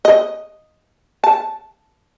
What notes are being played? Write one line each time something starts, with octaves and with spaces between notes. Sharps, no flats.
D#5
A5